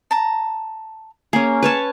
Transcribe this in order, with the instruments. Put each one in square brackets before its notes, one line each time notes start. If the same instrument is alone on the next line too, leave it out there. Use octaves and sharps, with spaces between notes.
[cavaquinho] A5 A#5
[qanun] A#3 C#4 [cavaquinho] G#4
[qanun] B4 C#5 A5